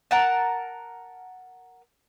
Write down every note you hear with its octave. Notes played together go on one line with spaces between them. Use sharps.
A#4 F#5 A5